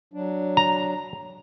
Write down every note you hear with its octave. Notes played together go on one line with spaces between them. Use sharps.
F#3 D4
A#5